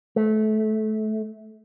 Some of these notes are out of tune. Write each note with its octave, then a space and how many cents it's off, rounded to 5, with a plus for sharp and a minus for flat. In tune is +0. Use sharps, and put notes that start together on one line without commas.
A3 -25